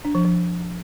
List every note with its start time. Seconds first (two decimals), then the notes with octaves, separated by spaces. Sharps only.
0.05 D4
0.15 F3
0.25 F3